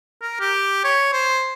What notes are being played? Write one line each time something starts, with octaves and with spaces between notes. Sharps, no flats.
A#4
G4
C#5
C5